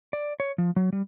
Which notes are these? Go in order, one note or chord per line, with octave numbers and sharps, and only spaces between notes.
D5
C#5
F3
F#3
G3